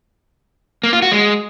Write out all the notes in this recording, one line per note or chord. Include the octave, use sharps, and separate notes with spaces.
A#3
F4
F#4
G#3